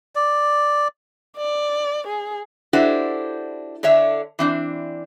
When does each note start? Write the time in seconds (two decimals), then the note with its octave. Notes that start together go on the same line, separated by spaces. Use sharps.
0.15 D5
1.37 D5
2.07 G#4
2.73 D4 E4 F#4 G4 A4 C5
3.83 D3 D4 C#5 E5
4.39 E3 C4 D4